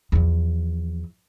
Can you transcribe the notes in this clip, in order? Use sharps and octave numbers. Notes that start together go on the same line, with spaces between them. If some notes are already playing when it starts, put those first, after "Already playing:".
E2 F3